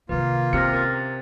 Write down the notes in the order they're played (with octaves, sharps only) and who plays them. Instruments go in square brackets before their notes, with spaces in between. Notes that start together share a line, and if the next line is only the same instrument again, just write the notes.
[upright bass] C3 D#3 [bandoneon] A#3 F4 [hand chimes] B4
[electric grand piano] C3 C#7 [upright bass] C#4 [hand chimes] F6 A#6
[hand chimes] A#4 A6